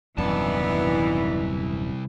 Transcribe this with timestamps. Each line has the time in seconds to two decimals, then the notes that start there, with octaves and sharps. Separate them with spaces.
0.18 D#1 C2 F#2 E3 B3 D4 D#4 A5